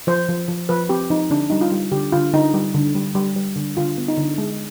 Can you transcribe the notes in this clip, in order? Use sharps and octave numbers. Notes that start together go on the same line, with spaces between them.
F3 C5
F3
F3
F3 B4
C4 G4
F3 D#4
D3 D4
G3 D#4
F4
G3
D3 G4
D3 F4
D3 D#4
G3
D3
G3
G3
G3
D3
D3 F4
B3
D#4
D3
G#3